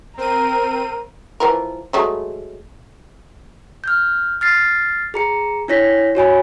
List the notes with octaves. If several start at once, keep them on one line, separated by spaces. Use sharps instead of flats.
C4 A#4 D#7
E3 F3 A#4
F#3 G#3 A3
F6 G6
F6 A6 C7
G#4 A#5 C#7
D4 E4 C#5 A#6 B6
F#4 C#5 G#5 B5